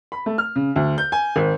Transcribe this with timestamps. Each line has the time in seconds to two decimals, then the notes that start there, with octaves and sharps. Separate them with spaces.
0.12 B5
0.26 A3
0.38 F6
0.56 C#3
0.76 D2
0.98 G6
1.12 G#5
1.36 G#1